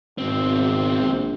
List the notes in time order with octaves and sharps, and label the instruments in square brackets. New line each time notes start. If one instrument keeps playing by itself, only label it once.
[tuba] G#1 [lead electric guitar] B2 C4
[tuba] A#1